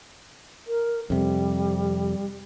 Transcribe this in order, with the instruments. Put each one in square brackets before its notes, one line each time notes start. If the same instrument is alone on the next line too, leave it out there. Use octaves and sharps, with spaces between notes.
[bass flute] A#4
[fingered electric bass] F2 C3 [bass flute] G3